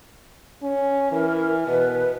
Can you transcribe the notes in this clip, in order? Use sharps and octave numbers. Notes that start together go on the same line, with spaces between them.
C#4
E3 A#4
B2 B4